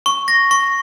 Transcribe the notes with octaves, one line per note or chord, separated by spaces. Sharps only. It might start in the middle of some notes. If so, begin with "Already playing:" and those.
C#6
A#6
C#6